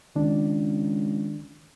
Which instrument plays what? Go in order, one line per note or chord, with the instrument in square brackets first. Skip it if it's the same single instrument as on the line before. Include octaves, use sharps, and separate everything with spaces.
[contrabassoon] C#2 [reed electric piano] D#3 D4